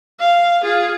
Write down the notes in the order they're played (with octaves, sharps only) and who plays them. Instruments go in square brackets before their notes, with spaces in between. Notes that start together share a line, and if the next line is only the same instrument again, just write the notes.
[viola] F5
F4 G#4